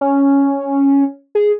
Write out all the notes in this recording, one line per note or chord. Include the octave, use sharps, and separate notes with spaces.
C#4
G#4